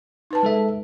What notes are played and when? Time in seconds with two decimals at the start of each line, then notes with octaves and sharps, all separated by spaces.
0.31 D#4 B4 A5
0.43 G#3 A4 E5